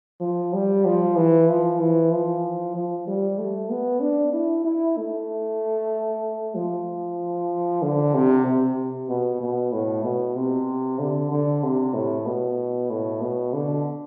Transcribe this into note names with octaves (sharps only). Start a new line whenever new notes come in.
F3
G3
F3
E3
F3
E3
F3
F3
G3
A3
B3
D4
E4
E4
A3
F3
D3
C3
C3
B2
B2
A2
B2
C3
D3
D3
C3
A2
B2
A2
B2
D3